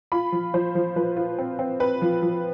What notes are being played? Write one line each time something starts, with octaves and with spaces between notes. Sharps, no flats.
F4 B5
F3
F3 C5
F3
F3 B4
F4
C4
C4
C4 B4
F3
F3